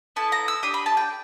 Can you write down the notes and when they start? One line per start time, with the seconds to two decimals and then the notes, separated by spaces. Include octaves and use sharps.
0.16 B3 E4 A4 A5
0.32 A#5
0.48 E6
0.63 D4 G4 D#6
0.74 B5
0.86 A5
0.97 G5